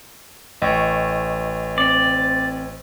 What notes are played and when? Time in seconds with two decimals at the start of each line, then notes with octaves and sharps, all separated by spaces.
0.62 A1 D#5 G5 C#6
1.78 C4 D5